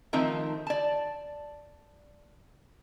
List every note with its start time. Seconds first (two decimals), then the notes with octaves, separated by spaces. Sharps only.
0.13 D#3 F3 A3 C4 D#4 A#4
0.67 D5 A5